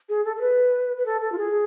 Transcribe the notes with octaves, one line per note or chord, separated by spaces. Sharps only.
G#4
A4
A4
B4
B4
A4
A4
F4
G#4